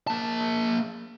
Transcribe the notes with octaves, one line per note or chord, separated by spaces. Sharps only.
A#3 A5